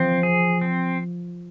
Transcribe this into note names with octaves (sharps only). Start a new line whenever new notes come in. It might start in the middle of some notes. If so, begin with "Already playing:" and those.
Already playing: F3 C4
G#4
C4